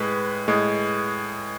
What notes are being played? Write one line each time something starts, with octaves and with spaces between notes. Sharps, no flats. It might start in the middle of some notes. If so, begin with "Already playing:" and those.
Already playing: A2 G#3 B4
A2 G#3